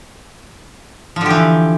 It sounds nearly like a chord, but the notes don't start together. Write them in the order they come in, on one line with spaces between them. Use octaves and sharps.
F3 D3 G4 E3